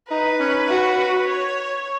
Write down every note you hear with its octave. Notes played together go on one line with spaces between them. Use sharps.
D#4 B4
C#4
F#4
C#5